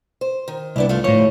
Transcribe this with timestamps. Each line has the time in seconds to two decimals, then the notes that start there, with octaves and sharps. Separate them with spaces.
0.21 C5
0.48 D#3
0.76 C2 B3 D4 E4
0.89 A3 F4
1.04 D2 A2 F3 C#5 F5